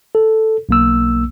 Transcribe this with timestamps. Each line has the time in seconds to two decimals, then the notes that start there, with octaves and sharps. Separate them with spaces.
0.15 A4
0.69 B1 A#3 E6